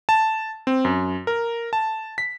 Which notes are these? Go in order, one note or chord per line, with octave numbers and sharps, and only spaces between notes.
A5
C4
F#2
A#4
A5
B6